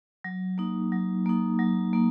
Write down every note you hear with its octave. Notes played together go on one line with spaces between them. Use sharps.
F#3
A#3 D#4
F#3
A#3 D#4
F#3
A#3 D#4